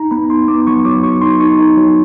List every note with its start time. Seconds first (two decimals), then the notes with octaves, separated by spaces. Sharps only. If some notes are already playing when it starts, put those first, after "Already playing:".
Already playing: D#4 A#5
0.11 B3 B5
0.30 D#4 C6
0.48 B3 D6
0.67 F#3 C#6
0.85 F#3 D6
1.03 F#3 C#6
1.22 D#4 C6
1.40 D#4 C#6
1.59 D#4
1.77 F#3